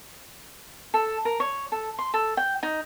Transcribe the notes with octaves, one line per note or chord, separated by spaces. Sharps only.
A4
A#4
C#5
A4
C6
A4
G5
D#4